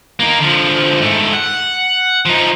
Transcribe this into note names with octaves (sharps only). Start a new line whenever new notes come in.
A#3 D#4
D3 F3
G#2 A3
F#5
F3 D#4